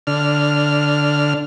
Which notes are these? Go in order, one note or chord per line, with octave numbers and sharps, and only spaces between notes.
D3 F6